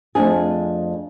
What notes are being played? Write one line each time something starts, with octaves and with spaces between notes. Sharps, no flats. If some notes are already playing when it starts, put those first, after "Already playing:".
F2 A3 D4 G#4